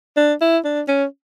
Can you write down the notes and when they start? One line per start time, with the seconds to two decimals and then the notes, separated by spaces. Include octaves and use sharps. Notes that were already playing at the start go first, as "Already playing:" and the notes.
0.17 D4
0.41 E4
0.65 D4
0.88 C#4